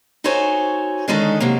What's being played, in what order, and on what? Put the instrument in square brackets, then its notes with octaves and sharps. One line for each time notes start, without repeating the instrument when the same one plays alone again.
[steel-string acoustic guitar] D#4 F#4 A4 C5 C#5 G#5
D3 D#3 G#3 C#4 D#4 A4
C3 F#3 A#3